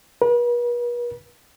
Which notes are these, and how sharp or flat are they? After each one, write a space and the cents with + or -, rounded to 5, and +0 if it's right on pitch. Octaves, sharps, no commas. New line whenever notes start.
B4 -45